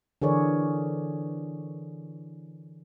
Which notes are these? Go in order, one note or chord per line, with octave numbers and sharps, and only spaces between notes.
D3 E3 G#4 A#4 C#5 D5